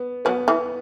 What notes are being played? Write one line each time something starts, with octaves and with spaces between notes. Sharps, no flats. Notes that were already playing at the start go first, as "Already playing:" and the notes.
Already playing: B3
F#3 B3
E3